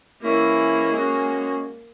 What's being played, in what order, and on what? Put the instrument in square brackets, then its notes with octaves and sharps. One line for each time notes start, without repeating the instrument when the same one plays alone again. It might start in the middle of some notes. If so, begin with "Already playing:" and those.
[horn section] E3 G#3 C#4 E4 [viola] A#3
[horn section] G#3 C#4 F#4